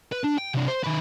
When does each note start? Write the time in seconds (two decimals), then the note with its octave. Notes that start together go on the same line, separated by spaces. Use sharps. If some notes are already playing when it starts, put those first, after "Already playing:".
0.12 B4
0.24 D4
0.38 G5
0.54 C3 D4
0.68 C5
0.84 D#3 B4